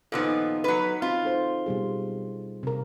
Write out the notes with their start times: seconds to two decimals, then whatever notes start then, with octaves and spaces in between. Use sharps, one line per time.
0.12 A#2 F3 B3 D#4 A4
0.64 F#3 B4
1.02 C4 F4 F#4
1.23 D#4 A4 C5
1.66 B2 G3 G#4
2.63 C3 A#4